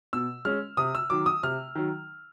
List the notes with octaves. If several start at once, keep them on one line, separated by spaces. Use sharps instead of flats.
B2 E6
G#3 C#4 F6
C3 D#6
E6
D#3 F#3 D6
D#6
C3 F6
D#3 F#3